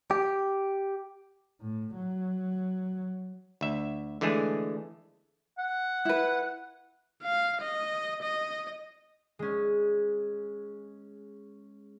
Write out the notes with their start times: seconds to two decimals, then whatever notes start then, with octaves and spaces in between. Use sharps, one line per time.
0.11 G4
1.61 A2
1.97 F#3
3.61 D2 E5
4.21 D3 E3 G#3 A3 G#4
5.58 F#5
6.05 E4 B4
7.23 F5
7.61 D#5
8.23 D#5
9.39 G#3 C#4